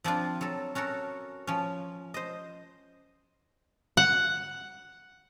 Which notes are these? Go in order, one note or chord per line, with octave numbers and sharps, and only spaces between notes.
F3 C4 D4 F4
F#3 A4
C#4 F#4 A4 A#4
F3 C#4
C5 D#5
F#5